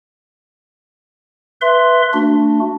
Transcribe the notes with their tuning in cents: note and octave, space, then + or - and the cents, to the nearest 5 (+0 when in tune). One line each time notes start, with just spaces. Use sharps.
B4 +0 E5 +15 C6 +0
A3 +25 D4 +0 F#4 -5